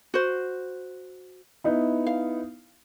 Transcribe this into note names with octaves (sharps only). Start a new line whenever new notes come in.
F#4 C5
B3 D#4 E4
F5